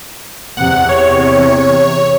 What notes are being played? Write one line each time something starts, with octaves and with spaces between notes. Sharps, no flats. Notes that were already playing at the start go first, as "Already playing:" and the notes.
E2 C3 F#5
C#5